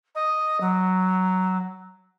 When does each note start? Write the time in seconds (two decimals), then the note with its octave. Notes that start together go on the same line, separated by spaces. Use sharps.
0.14 D#5
0.60 F#3